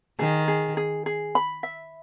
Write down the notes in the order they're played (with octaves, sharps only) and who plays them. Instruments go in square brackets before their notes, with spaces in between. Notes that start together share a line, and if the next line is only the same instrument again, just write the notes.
[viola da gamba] D#3 [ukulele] G#4
[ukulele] G#4
G#4
G#4
B5
E5